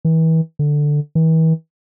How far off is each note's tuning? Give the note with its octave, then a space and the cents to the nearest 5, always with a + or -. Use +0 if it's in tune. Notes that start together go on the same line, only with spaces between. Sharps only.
E3 -35
D3 +5
E3 -40